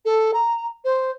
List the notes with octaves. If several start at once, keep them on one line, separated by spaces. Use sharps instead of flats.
A4
A#5
C5